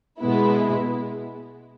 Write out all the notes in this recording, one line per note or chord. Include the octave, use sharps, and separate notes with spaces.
B2 G#3 B3 E4